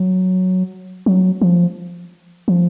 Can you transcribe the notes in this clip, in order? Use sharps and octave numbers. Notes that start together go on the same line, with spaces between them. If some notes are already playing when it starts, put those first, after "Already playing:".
Already playing: F#3
F#3
F3
F3